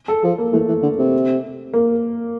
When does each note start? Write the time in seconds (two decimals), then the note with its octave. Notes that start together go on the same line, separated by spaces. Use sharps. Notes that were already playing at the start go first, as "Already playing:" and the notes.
0.08 A4
0.23 F3 A4
0.38 A#3
0.53 E3 A3
0.68 E3
0.83 D3
0.98 C3
1.73 A#3